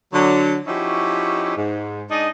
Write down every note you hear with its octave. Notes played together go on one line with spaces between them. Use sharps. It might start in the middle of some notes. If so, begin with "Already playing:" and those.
D3 F#3
F3 C#4 D#4 E4 F#4 G4
G#2
G#3 D4 D#4 D#5